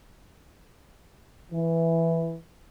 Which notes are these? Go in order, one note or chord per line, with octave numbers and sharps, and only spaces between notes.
E3